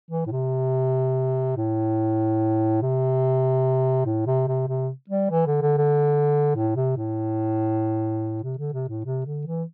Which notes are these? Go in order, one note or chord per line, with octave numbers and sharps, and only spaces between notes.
E3
A2
C3
A2
C3
A2
C3
C3
C3
G3
E3
D3
D3
D3
A2
C3
A2
C3
D3
C3
A2
C3
D3
E3